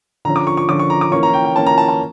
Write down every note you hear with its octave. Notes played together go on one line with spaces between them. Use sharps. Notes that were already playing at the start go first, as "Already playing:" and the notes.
D3 F3 C#4 A#5
D6
C#6
C#6
D3 F3 C#4 D6
C#6
A#5
D6
E3 A#3 C#4 C#6
A#5
G5
G5
E3 A#3 C#4 A5
A#5
A5
A5